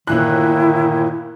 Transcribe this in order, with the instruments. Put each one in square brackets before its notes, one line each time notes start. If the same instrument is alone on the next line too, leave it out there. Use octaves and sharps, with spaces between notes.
[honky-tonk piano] G1 A#2 F#6 [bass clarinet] D#3 [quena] E4